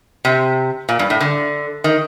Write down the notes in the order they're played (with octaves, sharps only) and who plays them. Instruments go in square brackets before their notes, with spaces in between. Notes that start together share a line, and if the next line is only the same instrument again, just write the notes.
[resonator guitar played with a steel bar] C3
A#2
G2
A2
D3
D#3